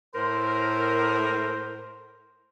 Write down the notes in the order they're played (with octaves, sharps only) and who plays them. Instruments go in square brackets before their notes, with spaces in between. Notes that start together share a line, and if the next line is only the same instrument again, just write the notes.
[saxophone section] A2 A#4 [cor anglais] C5